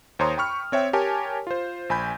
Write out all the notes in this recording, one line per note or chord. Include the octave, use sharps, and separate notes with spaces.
D#2 C5 C#5 A#5 C6 D#6
G5 B5 C#6 F6
C4 C#5 E5 G5
G4 A#4 C#5 G#5 A5
F4 C5
A#1 G#5 B5 G6